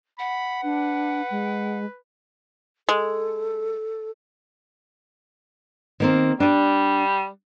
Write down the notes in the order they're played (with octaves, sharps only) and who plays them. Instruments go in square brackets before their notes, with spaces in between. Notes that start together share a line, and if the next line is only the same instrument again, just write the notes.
[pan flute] F#5 [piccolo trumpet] B5
[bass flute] D4 [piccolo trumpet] B4
[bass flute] G#3
[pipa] G#3 [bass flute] A4
[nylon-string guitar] D#3 A#3 C4
[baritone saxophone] G3 [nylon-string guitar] D4 D5